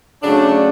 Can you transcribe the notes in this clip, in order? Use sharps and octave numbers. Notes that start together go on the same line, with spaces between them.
C#3 F#3 A3 D4